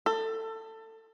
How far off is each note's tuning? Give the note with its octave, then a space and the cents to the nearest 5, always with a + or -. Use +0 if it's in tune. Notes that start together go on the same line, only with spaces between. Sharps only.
A4 +20